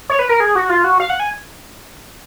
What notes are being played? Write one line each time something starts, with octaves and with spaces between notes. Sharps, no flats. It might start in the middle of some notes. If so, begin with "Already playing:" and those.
C#5
B4
A#4
G#4
F#4
F4
F#4
F5
F#5
G#5